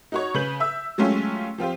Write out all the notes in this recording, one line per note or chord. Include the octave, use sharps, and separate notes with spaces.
D#4 F#4 C#5
C#3 B4 G6 F#7
E5 E6
F#3 G#3 A3 C#4 F4 G4
F3 C4 F4 G4